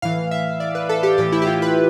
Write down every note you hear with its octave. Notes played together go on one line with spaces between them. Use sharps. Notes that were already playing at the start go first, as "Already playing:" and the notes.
A2 E3 F5
E5
D5
B4
A4
G4
A2 E3 G4
E4
G4
F4
B4